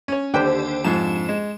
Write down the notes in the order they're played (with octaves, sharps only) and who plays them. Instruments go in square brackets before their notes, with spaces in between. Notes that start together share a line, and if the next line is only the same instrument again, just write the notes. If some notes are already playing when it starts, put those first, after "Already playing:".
[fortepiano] C#4 C#5
[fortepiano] D#2 D3 G5 [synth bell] D4 G4 C5
[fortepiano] F2 G#2 [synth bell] E7
[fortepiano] G#3